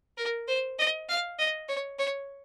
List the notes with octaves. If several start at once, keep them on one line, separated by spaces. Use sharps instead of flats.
A#4
C5
D#5
F5
D#5
C#5
C#5